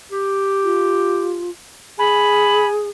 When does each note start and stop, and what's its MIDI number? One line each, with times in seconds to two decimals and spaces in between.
0.11 1.42 67
0.64 1.50 65
1.99 2.90 68
1.99 2.80 80
1.99 2.66 83